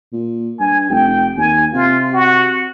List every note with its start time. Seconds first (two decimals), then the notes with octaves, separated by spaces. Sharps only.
0.13 A#2
0.60 G2 G#5
0.90 F1 G5
1.37 D#2 G#5
1.74 C3 F4
2.13 F#4